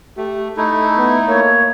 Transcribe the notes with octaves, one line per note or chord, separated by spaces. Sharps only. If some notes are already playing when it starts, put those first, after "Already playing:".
A3 G4
A3 D#4 E4 A4
B3
A#3 C#5